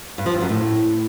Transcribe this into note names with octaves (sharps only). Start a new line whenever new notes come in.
G2
F3
G2
F#2
A2